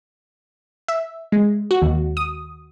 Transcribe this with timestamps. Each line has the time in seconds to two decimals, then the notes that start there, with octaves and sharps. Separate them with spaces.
0.88 E5
1.32 G#3
1.71 F#4
1.82 D#2
2.17 D#6